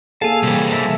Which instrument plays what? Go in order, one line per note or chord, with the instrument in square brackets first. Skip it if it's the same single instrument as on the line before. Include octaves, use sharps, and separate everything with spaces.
[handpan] A#3 G#4 A4 [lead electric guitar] F5 [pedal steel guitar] G#5 A5
[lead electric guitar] C3 E3 [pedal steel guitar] G3
[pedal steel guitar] A#4 E5 A5